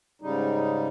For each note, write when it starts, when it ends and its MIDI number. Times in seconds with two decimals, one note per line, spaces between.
0.22 0.88 44
0.22 0.88 49
0.22 0.88 55
0.22 0.88 63